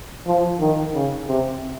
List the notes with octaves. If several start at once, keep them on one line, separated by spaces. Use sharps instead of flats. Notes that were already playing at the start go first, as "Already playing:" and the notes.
F3
D#3
C#3
C3